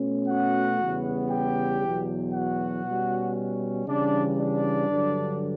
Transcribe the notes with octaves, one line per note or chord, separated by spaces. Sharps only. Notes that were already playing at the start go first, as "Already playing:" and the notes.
Already playing: B2 A3 C#4
F#4 F#5
E2 C#3 G3 B3
G4 G5
E2 B2 F#3
F#4 F#5
B2 G3 C#4
C#3 E3 G3 D4 D5
D4 D5
G2 D3 F#3